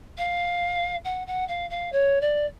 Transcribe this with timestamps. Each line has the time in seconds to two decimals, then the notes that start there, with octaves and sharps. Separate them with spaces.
0.17 F5
1.04 F#5
1.27 F#5
1.47 F5
1.70 F5
1.92 C#5
2.21 D5